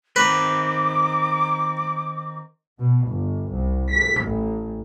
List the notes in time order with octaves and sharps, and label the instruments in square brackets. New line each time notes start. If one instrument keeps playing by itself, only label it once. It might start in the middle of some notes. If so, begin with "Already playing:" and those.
[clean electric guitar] D#3 C4 [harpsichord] B4 [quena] D6
[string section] B2
G1
C2
B6
A1